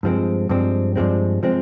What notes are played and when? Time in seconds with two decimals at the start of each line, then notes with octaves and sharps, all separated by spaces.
0.03 G2 F3 G#3 C4
0.49 G2 F3 G#3 C4
0.96 G2 F3 G#3 C4
1.43 F3 G#3 C4